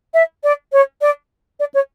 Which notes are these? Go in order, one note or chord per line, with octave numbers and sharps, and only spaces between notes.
E5
D5
C#5
D5
D5
C#5